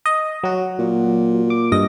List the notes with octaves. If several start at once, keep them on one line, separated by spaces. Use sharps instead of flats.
D#5
F#3 F#4
A#2
D6
G2 D#5 A#6